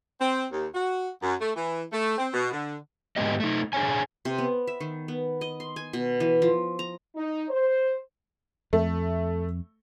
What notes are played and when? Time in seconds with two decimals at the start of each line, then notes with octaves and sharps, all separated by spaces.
0.20 C4
0.51 D#2
0.74 F#4
1.23 F#2
1.40 A3
1.56 E3
1.92 A3
2.18 C4
2.34 B2
2.51 D3
3.16 G#2 D3 G#3 B3 G4 D#5
3.40 A3 D#4
3.73 D4 G#4 C5 C#5 G#5
4.25 C3
4.38 B3
4.67 E5
4.80 D#3
5.08 B3
5.41 D#5
5.60 C6
5.76 G#5
5.93 B2
6.20 E3
6.42 F3
6.79 A#5
7.16 D#4
7.49 C5
8.73 F2 A3